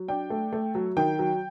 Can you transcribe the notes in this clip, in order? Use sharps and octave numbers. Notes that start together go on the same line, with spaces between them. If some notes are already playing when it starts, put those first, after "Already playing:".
Already playing: F#3
D4 G5
A3
A3
F#3
D#3 G5
F#3